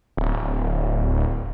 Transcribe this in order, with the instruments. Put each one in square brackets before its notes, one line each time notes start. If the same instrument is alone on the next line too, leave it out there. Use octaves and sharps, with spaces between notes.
[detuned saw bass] D1